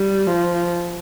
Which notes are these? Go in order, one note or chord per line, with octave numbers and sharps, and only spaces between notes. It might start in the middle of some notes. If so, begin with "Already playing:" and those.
Already playing: G3
F3